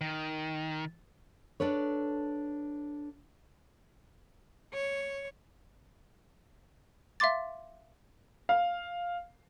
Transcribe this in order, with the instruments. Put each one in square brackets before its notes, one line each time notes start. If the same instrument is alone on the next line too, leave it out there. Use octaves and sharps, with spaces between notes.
[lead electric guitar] D#3
[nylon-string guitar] D4 A4 B4 C#5
[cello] C#5
[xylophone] E5 F5 C6 D6 A6
[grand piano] F5